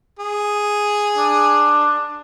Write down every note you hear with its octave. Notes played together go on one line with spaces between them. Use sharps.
G#4
D4